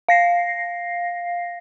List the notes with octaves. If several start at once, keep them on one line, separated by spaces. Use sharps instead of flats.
F5 A#6 C7